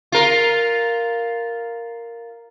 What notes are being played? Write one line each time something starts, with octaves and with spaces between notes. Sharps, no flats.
F4 A#4